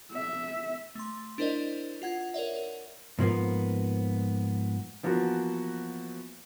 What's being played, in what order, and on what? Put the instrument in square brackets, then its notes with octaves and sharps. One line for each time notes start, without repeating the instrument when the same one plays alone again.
[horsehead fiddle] E5
[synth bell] A3 C6
D4 E4 A#4 C5 D5 D#5
F4 F#5 G#6
A#4 C#5 D5 E5
A#4
[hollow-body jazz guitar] G#2 F3 A#3 B3
[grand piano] E3 F3 A#3 B3 F#4